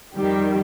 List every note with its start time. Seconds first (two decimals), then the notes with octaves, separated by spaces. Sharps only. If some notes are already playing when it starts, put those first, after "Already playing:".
0.15 F2 D#3 G3 G4